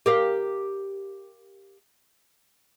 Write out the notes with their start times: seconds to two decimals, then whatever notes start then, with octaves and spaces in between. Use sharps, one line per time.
0.06 G4 A#4 F5